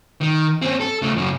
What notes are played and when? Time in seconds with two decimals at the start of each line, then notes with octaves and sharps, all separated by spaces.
0.21 D#3
0.62 C4 C#4
0.80 A4
1.02 C#3 A3
1.16 F#2 C#3